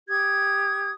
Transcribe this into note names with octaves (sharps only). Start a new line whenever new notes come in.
G4 D#6 G#6